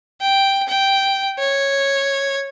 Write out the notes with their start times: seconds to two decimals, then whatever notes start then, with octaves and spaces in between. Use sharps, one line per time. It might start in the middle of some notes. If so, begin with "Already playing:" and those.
0.21 G5
0.68 G5
1.39 C#5